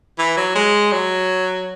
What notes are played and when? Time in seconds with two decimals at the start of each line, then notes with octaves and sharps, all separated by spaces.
0.18 E3
0.37 F#3
0.55 G#3
0.92 F#3